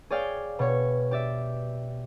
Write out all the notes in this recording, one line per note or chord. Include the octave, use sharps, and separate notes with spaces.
G#4 C#5 D5 F5 G5
B2 C#5
G4 D5 E5